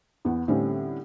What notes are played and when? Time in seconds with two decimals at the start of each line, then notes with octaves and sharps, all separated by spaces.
0.25 E2 B3
0.48 A2 D3 G3 C4 C#4